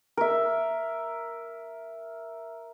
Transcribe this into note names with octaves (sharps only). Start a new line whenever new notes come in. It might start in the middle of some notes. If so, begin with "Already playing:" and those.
A#4 E5